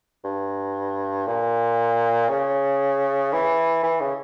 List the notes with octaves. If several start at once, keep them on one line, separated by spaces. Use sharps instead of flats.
G2
A#2
C#3
E3
E3
C#3